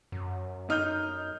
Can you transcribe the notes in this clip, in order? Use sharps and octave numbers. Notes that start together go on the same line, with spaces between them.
F#2
D#4 F6 G6